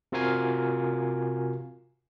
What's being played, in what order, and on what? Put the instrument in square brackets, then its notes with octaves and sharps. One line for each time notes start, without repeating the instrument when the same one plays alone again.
[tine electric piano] C3 F4 F#4 A#4 F5 G#5